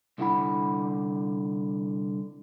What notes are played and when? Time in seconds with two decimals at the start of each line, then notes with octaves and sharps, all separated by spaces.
0.18 C2 D3 E4 F#5 B5